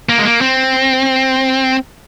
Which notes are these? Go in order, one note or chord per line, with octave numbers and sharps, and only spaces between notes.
A#3
G#3
A#3
C4